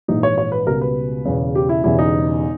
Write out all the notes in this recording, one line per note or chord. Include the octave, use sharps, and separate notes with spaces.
A#1 G#2 E3 D#4
C#5
C#5
B4
C#2 B2 G3 A#4
B4
E1 E2 C#3
G4
E4
E1 E2 C#3 G3 E4
D#4